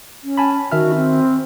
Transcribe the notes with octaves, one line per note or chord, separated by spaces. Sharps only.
C#4
G#5 A5 B5
D#3 F#4 E5 F6
C4